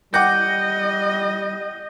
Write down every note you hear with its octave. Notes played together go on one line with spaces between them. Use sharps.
G3 D#5 F#5 G5 D6 G6 A#6